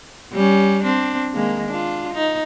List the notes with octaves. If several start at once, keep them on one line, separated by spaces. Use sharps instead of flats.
G3 C#4
C4 D4
D#3 G#3 A#3
D4 F4
D#4